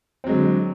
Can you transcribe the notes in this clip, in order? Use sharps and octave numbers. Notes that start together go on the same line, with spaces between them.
D3 F#3 G#3 C4